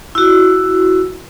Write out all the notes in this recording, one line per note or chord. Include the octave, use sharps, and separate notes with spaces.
E4 F#4